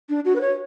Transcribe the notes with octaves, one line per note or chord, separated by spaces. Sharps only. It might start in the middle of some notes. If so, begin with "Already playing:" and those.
D4
F#4
B4
C#5